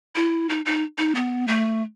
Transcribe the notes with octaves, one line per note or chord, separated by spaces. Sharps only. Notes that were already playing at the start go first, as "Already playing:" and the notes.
E4
D#4
D#4
D#4
B3
A3